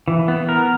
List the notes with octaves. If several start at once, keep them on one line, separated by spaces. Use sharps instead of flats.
E3
B3
A#4